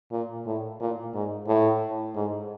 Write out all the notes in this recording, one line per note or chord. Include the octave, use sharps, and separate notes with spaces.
A#2
A2
A#2
G#2
A2
G#2